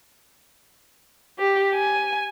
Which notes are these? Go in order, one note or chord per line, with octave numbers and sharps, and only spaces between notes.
G4
G#5